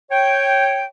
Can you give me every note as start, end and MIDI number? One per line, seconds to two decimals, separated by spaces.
0.11 0.85 73
0.11 0.85 79